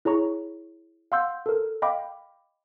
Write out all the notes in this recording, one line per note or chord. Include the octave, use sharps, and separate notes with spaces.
E4 G#4 C#5 A#5 C#6
F5 F#5 C6 E6 G6
A4 A#4
D#5 F5 G5 B5 D6